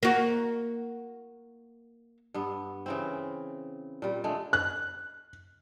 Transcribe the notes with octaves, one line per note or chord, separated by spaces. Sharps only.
A#3 F#4
G2 B3
C#3 E3 C4
A#2 G3
D3 G#3 A3
F#6